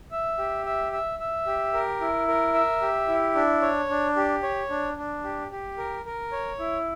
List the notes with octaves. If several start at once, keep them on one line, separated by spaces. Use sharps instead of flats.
E5
G4
E5
E5
E5
G4
A#4
E4
A#4
E5
G4
E4
D4
C#5
D4
G4
C#5
D4
D4
G4
G4
A#4
A#4
C#5
E4